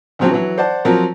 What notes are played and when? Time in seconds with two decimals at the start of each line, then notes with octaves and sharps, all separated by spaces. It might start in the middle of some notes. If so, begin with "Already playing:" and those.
0.19 D2 C#3 F3 F#3 C4
0.31 E3 F#3
0.58 C5 D5 F#5 A5
0.85 F3 F#3 C4 A#4